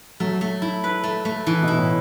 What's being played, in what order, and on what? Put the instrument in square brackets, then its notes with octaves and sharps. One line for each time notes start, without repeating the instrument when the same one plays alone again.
[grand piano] F#3 [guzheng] A3
[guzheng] A3
E4
B4
A3
A3
E3
[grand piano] B2 [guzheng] E4
[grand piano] A2